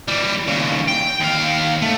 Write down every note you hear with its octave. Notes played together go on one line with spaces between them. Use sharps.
E3 G3
D#2 C#3
G5
D#2 F5
A3